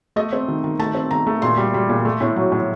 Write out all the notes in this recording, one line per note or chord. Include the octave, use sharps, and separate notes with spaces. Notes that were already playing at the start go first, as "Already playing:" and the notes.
A3 D#5
C4
D#3
D#3
A3 A5
C4
D#3 A#5
A3
A#2 C6
G3
G3
A#2
A3
A2
F#3
A2